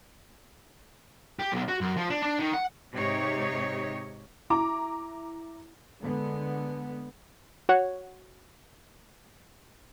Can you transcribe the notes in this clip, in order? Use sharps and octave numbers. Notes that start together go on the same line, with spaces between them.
G4
B1
F#4
F#2
F3
D4
D4
D#3
F#5
G#2 C3 D#4 G4 C#5
E4 A#5 D6
D3 G#3 B3
F#4 C#5 F#5